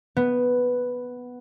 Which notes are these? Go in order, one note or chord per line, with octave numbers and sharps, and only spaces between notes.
B3